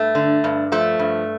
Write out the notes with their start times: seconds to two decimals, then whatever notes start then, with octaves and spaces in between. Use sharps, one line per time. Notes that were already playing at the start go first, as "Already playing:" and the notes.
Already playing: G2 A3
0.15 D3
0.44 G2
0.72 F3 A3
0.99 G2